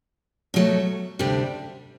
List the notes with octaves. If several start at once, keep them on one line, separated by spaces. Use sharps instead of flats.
B2 F#3 A3
D2 C3 G3 D4